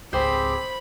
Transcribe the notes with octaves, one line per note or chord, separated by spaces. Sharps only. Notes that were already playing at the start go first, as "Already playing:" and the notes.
G#1 C#2 C4 G4 G#4 C5 B5